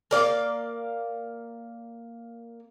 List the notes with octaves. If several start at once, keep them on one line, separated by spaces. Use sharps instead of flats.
A#3 D5 F5